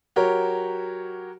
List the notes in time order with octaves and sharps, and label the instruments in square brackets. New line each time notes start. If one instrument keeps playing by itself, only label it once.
[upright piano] F#3 F#4 G4 A#4 C#5